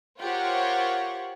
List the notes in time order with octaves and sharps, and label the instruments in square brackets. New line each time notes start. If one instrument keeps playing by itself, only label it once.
[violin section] F4 G4 A#4 C5 C#5 F#5